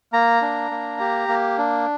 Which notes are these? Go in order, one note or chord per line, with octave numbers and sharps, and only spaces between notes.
A#3 A#5
D4
A#3
G4
A#3
D4